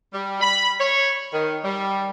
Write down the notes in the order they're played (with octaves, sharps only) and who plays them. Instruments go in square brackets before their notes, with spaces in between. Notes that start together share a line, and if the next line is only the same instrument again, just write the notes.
[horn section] G3
B5
C#5
D#3
G3